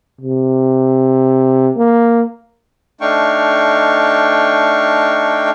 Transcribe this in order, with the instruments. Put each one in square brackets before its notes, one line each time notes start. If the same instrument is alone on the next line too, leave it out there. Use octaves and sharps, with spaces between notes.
[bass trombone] C3
A#3
[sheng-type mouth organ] A3 D4 D#4 F5 G5 C#6